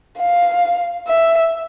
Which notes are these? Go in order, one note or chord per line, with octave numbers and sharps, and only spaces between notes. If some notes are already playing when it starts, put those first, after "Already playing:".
F5
E5